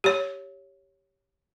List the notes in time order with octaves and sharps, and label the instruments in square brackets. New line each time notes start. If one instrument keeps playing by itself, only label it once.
[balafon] G4 C#5